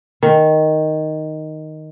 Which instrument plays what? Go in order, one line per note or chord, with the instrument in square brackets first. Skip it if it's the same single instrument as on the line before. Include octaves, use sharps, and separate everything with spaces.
[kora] D#3